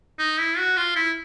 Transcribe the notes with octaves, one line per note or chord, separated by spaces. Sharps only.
D#4
E4
F#4
F4
E4